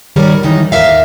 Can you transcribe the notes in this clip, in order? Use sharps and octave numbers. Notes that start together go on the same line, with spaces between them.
D#3 G3 A#4 C#5
D#3 E3 F#3 D#4
D#2 G#2 A#4 E5 F5